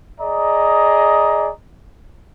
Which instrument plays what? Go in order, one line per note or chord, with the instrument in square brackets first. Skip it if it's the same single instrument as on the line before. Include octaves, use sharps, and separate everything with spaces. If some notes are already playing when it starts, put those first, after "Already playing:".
[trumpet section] G#4 D5 D#5 A#5